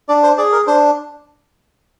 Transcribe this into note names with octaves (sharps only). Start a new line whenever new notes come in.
D4 D5
C5
G#4 D5
A#4
D4 C5